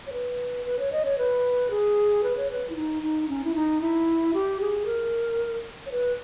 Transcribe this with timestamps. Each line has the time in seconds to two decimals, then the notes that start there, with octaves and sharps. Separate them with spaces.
0.07 C#5
0.12 B4
0.66 B4
0.79 C#5
0.92 D#5
1.05 C#5
1.18 B4
1.71 G#4
2.23 B4
2.37 C#5
2.51 B4
2.70 E4
2.76 D#4
3.03 D#4
3.29 C#4
3.44 E4
3.55 D#4
3.81 E4
4.34 G4
4.61 G#4
4.86 A#4
5.86 C#5
5.92 B4